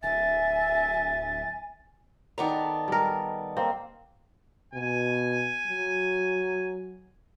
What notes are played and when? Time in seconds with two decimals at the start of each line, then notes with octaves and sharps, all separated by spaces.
0.03 D1 E5 G#5 A6
2.38 D#3 B3 A4 D5 D#5 A#5
2.88 G3 A#4
3.57 A#3 C4
4.74 B2 G#5
5.66 F#3